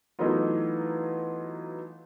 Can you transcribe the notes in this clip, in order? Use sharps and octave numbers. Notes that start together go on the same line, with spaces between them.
E3 F#3 A3 B3 D#4 F4